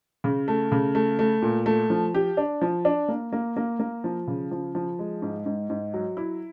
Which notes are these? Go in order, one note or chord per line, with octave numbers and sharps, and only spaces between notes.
C#3
A3
C#3
A3
A3
A#2
A3
F3
G4
D4
F3
D4
A#3
A#3
A#3
A#3
F3
C#3
F3
F3
G#3
G#2
G#2
G#2
F#3
E4